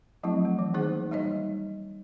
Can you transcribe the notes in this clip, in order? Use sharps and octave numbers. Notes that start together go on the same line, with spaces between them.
F3 F#3 A3 C4 E4
A3
E3
D#3 A#3 D#4 G#4 C5
G3 D#4 C#5 D#5